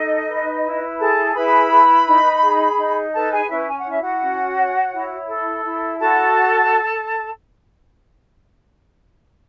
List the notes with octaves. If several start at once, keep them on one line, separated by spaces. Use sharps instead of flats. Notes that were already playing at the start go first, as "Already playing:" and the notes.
Already playing: D#4 A4 D#5
B4
E4
G#4 A4 A5
E4 B4 B5
B4
D#4
G#4
D#4
A4 B4 A5
G#4 G#5
C#4 E4 E5
G#5
F#5
E4
E5
F#4 F#5
C#4
C#5
E4
A4
E4
F#4 A4 A5